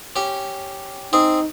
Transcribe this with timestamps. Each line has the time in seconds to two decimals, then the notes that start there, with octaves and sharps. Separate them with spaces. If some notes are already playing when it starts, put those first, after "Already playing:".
0.16 C#4 G4
1.13 C4 D#4 G#4